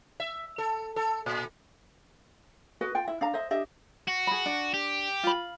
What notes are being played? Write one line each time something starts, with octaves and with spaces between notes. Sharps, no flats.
E5
A4
A4
A#2
F#4 B4 D#5
F4 G5
E4 E5
D4 F5 A#5
C5 D#5 E5
D4 G4 D#5 E5
F#4
G#4 B5
D4
G4
F4 B5